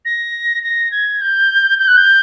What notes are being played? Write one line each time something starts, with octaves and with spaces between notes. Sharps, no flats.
A#6
A#6
G#6
G6
G6
F#6
G6